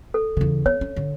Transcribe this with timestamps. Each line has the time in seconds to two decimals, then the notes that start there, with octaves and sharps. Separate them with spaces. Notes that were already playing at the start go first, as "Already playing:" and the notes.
0.14 A4
0.37 E2 C#3
0.66 B3 C#5
0.81 C#4
0.96 D3